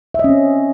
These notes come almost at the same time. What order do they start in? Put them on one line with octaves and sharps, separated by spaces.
E5 D#5 C#4 C4